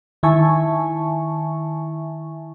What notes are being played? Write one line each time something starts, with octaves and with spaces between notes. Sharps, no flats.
D#3 E4 E5 G#5 A5 C#6